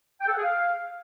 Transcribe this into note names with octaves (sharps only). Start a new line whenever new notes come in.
G5
A4
F#5
G#4
F5